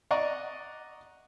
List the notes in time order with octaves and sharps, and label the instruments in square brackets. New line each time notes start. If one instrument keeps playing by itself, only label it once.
[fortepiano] D5 D#5 F#5 A#5 C#6